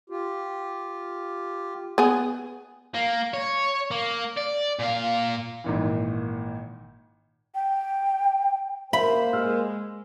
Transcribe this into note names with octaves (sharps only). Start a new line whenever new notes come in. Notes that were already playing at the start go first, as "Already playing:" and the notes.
F4 G4
B3 G#4
A#3
C#5
A#3
D5
A#2 F5
G#1 A#2 E3
G5
A#3 C5 E5 B5
G#3 E6 F6